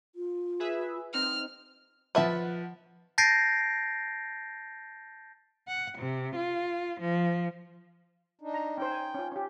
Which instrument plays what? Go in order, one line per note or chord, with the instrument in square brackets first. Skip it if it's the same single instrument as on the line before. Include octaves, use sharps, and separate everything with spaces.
[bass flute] F4
[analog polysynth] G#4 B4 E5
[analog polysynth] C4 D#4 [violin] F6
[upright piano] F3 F#5 [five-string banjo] B4 E5 A5
[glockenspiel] A5 G6 A6 A#6 C7 D7
[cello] F#5
C3
F4
F3
[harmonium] D4 D#4
[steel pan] A#5
[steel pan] C#4 D#4 C5 [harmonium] G5
[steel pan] G#5
C#4 F4
C#4 G4